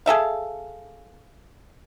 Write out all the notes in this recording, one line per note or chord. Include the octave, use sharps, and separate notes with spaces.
G#4 A4 E5 F5